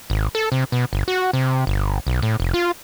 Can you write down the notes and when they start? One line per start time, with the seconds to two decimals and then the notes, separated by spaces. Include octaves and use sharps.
0.10 G#1
0.35 A4
0.52 C3
0.72 B2
0.93 G1
1.08 F#4
1.33 C3
1.67 G1
2.07 B1
2.23 A2
2.40 F1
2.54 F4